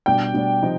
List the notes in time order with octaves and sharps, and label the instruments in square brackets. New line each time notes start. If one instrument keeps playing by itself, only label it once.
[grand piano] B2 G3 D4 [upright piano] G5
[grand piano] B2 G3 D4
C3 F3 D#4